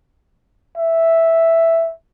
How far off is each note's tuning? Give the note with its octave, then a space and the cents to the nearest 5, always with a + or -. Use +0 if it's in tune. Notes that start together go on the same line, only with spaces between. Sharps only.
E5 +0